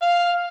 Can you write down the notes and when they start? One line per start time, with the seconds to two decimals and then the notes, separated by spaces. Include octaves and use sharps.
0.02 F5